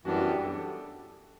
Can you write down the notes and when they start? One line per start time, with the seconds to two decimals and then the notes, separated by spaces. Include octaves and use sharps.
0.04 F#2 E3 G3 B3 D4 F#4
0.25 G4
0.44 A4